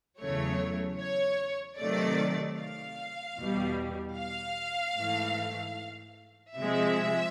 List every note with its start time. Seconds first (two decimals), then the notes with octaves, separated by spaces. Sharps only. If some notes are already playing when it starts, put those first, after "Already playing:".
0.19 E2 C#3 F#3 A3 C#5
0.99 C#5
1.79 C3 D#3 F#3 A3 D5
2.58 F5
3.38 E2 B2 G3
4.18 F5
4.98 G#2 E3 A3
6.56 C3 F3 G#3 E5